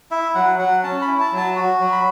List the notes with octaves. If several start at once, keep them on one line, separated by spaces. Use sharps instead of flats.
E4 E5
F#3 F#5
F#3 F#5
C#4 A5
B5
E4
A5
F#3
A5
F#4
F#3
B5